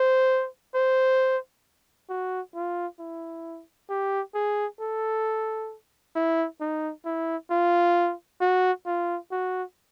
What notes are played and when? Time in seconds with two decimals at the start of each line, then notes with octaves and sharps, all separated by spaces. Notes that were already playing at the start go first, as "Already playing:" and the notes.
Already playing: C5
0.74 C5
2.09 F#4
2.55 F4
2.99 E4
3.89 G4
4.35 G#4
4.80 A4
6.15 E4
6.60 D#4
7.05 E4
7.50 F4
8.41 F#4
8.86 F4
9.31 F#4